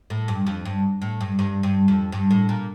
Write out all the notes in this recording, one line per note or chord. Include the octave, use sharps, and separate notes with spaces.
A2
G2
F2
G2
A2
G2
G2
G2
F2
G2
A2
A#2